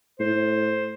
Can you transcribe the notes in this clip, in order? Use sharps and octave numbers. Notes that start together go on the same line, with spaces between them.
A2 C5